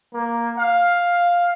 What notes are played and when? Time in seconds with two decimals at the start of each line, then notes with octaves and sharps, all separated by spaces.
0.14 A#3
0.58 F5